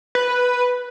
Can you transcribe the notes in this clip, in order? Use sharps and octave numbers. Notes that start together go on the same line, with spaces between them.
B4